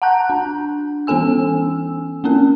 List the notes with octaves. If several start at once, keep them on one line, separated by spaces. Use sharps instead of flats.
F#5 A5 A#5 F#6 G6
D4
E3 B3 C#4 A4 G#5 E6
A#3 C4 C#4 A#4